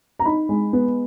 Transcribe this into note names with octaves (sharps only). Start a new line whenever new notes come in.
A#5
D#4 B5
G#3
B3